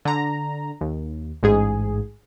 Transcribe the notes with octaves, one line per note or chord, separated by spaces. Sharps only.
D3 A#5
D#2
A1 G#2 G#4